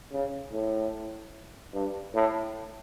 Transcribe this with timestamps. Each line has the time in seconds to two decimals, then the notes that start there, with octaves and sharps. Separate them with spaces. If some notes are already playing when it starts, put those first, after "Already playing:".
0.12 C#3
0.53 A2
1.73 G2
2.14 A2